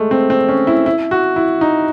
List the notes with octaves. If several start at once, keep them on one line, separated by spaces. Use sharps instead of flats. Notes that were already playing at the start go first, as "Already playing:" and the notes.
Already playing: G#3 A3
C4
C4
C#4
E4
E4
F#4
E4
D#4